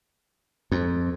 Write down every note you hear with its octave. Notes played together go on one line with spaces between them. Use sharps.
F2